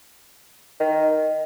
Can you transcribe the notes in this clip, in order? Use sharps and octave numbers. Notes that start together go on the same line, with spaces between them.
D#3